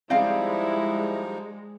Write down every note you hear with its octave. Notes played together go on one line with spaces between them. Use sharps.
F3 G3 G#3 C4 D#4 E4 D5 F5